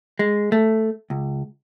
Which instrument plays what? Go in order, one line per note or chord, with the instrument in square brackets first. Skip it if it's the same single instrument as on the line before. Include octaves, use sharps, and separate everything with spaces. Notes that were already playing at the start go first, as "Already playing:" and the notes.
[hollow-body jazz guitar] G#3
A3
C#2